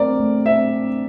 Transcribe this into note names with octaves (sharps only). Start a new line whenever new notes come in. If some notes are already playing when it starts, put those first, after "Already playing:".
Already playing: A3 C4 A#4 D5
A3
C4 E5